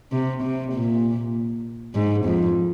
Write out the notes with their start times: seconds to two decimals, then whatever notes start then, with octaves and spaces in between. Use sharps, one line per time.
0.12 C3
0.43 C3
0.73 A#2
1.95 G#2
2.25 F2